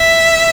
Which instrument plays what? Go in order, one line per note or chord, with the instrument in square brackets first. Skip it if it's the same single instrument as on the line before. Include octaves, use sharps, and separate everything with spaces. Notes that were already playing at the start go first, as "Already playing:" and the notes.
Already playing: [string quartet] E5